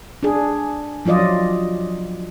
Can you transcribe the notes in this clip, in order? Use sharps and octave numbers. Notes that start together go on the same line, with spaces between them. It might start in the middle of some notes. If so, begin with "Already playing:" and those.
D4 G#4
F3 F#3 F4 D5 D#5